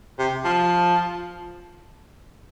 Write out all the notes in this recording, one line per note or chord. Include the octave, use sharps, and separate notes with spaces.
C3
F3